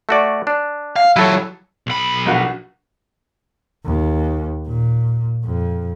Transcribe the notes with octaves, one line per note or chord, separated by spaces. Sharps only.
A3 F#4 D5
D4
F5
E3 F#3 E4 A4 C#5
B1 B5
A#1 F#4
D#2
A#2
F2